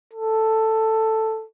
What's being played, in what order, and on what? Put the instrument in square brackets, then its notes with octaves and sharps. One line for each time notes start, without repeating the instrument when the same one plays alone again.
[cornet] A4